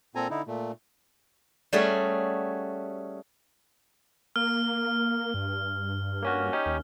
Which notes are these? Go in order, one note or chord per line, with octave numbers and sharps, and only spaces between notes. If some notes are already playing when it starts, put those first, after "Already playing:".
A#2 C4 A4 G#5 A#5
D3 D#4 E4
A#2 A3
G3 A3 C#4 F#4 G#4
A#3 F6
G2
A#3 C#4 F#4
C#4 D#4 G4
D#2